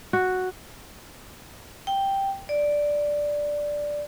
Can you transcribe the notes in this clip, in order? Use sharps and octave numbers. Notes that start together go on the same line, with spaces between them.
F#4
G5
D5